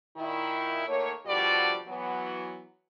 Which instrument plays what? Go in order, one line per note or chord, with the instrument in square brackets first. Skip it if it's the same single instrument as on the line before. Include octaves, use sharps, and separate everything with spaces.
[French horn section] A#2 D#3 E4
D#3 A3 A#3 C#5
B2 D3 F3 G3 F#4 D5
E3 F#3 B3